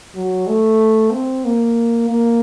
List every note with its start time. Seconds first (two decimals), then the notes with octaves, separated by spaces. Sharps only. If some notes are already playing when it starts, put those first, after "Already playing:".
0.16 F#3
0.48 A3
1.12 C4
1.45 A#3
2.09 A#3